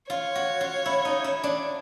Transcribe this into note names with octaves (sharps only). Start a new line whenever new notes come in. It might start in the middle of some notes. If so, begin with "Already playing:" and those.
F4 C#5
F#4
F4
E4
D#4
E4
D4